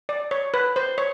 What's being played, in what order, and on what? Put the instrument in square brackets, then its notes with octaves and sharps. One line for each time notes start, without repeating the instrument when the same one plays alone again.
[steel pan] D5
C#5
B4
C5
C#5